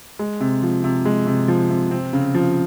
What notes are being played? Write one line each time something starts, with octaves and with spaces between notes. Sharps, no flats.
G#3
C3
F3
C3
G#3
C3
F3
C3
C4
C#3
F3